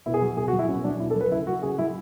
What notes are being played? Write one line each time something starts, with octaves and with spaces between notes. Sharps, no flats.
B2 E4
G#4
F#3 F#4
B2 G#4
F#4
F#3
E4
B2 C#4
F#3 D4
B2 E4
A4
F#3
B4
C#3 E4
F#3 F#4
C#3 G#4
F#3 E4